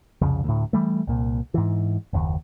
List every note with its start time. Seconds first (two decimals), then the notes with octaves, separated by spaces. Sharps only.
0.21 C2 F2 C#3
0.44 D2 A2
0.73 E3 G3 A3
1.07 C2 A#2
1.54 G#2 E3
2.13 F#1 D#2